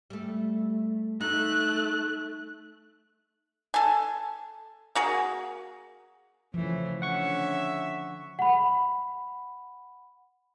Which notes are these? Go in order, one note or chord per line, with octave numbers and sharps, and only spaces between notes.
G3 A3
A3 D#4 F#6
A4 G#5
A#3 F#4 G#4
C#3 E3 F3 A3
D3 C#4 E5 F#5 C#6 C#7
F#5 B5